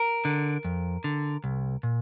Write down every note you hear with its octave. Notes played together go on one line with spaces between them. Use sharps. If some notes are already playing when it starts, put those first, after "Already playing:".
Already playing: A#4
D3
F2
D3
C2
A#2